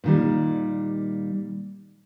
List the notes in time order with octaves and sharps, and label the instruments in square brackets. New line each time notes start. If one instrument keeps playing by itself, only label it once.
[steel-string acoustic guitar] A#2 D#3 G3